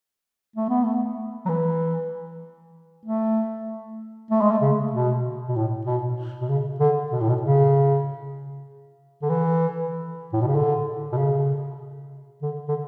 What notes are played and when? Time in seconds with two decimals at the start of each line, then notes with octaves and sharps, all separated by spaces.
0.56 A3
0.69 B3
0.84 A3
1.45 F#3
1.49 E3
3.05 A3
4.31 A3
4.41 G#3
4.51 A3
4.62 C#3
4.92 B2
5.49 B2
5.56 A2
5.86 B2
6.41 B2
6.49 C#3
6.80 D3
7.11 B2
7.21 A2
7.29 B2
7.42 C#3
9.22 D3
9.30 E3
10.33 A2
10.41 B2
10.47 C#3
10.55 D3
11.12 B2
11.17 C#3
12.42 D3
12.68 D3